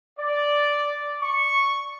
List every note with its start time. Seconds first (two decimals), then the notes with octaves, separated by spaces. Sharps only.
0.19 D5
1.22 C#6